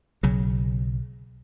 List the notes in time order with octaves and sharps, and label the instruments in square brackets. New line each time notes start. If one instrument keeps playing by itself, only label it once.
[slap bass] B1 C#3 F#3